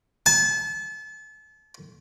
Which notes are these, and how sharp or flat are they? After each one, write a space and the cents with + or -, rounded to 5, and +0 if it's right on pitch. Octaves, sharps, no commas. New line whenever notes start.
A5 -35